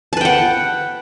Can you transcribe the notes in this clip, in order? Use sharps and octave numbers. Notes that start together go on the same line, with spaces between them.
B4 F#5 G5 A5